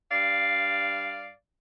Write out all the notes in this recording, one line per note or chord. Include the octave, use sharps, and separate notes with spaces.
G2 D5 F5